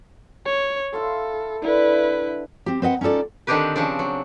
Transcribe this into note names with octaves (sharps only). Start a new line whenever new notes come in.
C#5
E4 A4 F5 C6
D3 E4 B4
C4 G4
C4 B4 D#5 F#5
C#4 D#4 F4 A4 D5
D3 D#3 C4 D4 G4 B4
C#3 F3 C4 D4
F#3